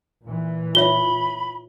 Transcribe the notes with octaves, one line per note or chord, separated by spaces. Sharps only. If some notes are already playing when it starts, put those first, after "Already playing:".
A#2 E3
F4 C#5 E5 B5 G7